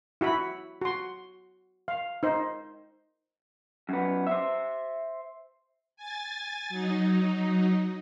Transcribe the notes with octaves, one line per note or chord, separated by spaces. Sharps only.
E4 F#4 E5 B5
F#4 C6
F5
D#4 C5
F#2 B3
C5 E5
G#5 A6
F#3 D#4